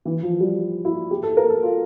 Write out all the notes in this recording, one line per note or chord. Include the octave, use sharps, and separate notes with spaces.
E3
F3
G3
E4
G4
A4
A#4
A4
F4